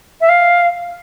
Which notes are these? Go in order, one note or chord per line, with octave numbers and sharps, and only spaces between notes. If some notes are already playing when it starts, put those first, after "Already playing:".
E5
F5